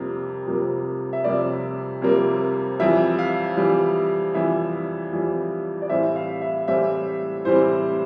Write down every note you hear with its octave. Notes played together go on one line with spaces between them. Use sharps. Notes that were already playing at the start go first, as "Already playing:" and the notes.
Already playing: F2 C3 G3 A#3
F2 C3 G3 A#3
E5
F2 C3 G3 A#3 D5
F2 C3 G3 A#3
F2 E3 G3 E5
F5
F2 E3 G3
F2 E3 G3 E5
F2 E3 G3
D5
A2 E3 G3 C4 E5
F5
E5
A2 E3 G3 C4 E5
A2 E3 G3 C4 C5